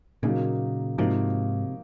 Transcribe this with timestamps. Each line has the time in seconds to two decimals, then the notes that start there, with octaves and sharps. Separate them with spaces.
0.23 A#2 C#3 F#3 A#3 D#4
0.98 G#2 C3 F3 A#3 D#4 F#4